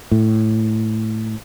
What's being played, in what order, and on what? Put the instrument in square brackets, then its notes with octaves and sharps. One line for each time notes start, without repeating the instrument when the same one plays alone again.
[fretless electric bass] A2